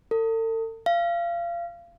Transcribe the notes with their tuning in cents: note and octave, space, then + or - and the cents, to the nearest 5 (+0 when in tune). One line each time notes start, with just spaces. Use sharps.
A4 +40
F5 -30